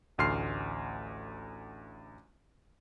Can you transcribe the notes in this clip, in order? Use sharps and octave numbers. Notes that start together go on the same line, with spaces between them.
A1 D2 C6 F6 C7